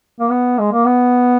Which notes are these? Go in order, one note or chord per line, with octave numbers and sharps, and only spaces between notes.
A#3
B3
G#3
A#3
B3